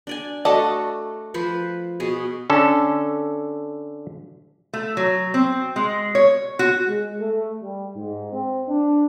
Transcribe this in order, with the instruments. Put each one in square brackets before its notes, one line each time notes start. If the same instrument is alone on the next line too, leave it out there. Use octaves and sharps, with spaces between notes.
[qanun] D4 D5 G#5
[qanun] A3 F#4 [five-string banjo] A4 D5 D#5
[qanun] F3 B4 C5
B2 G#4
[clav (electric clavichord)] D3 C#4 A4
[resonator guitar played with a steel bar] A3
F#3
C4
G#3
C#5
F#4
[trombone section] G#3
A3
G3
G#2
C4
D4